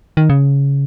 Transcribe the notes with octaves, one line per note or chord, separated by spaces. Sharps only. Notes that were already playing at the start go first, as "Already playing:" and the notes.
D#3
C#3